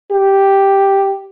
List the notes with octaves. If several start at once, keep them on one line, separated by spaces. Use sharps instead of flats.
G4